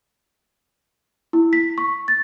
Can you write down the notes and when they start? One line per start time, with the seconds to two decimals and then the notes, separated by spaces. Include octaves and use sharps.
1.33 E4
1.53 B6
1.78 C#6
2.08 A6